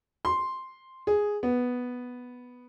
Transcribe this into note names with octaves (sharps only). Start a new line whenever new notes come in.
C6
G#4
B3